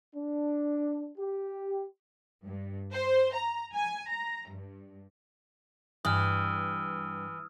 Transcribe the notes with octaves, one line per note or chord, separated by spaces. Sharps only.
D4
G4
G2
C5
A#5
G#5
A#5
G2
G2 E3 D#6 F6